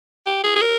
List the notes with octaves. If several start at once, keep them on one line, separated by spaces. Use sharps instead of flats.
G4
G#4
G#4
A#4